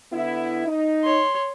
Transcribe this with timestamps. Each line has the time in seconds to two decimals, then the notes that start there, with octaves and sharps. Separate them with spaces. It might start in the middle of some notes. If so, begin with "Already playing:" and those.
0.13 D3 B3 E4
0.67 D#4
1.03 C#5 C6